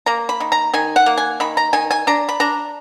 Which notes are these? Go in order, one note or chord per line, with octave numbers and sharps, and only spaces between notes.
A#3 A#5
B5
D#3
A#5
D#3 G#5
F#5
A#3
G#5
D#3 B5
A#5
D#3 G#5
G#5
D4 A#5
B5
D4 A#5